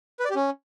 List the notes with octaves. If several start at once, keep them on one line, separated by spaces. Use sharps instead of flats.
B4
D5
G4
C#4